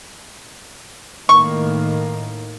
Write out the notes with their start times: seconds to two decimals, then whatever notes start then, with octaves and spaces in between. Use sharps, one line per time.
1.29 A2 D#3 A#3 C#6